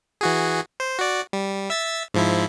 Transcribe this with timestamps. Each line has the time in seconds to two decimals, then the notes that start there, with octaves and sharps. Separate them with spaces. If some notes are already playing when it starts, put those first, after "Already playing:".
0.21 E3 F#4 G#4
0.80 C5
0.99 F#4 D5
1.33 G3
1.70 E5 E6 A6
2.14 G#2 F3 E4